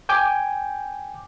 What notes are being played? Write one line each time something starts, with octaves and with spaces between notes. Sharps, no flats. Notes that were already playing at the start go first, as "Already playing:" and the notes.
G5 G#5 D6 G6